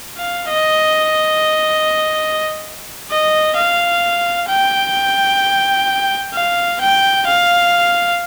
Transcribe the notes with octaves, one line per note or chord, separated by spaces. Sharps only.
F5
D#5
D#5
F5
G5
F5
G5
F5